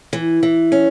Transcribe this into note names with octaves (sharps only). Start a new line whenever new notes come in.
E3
E3
C#4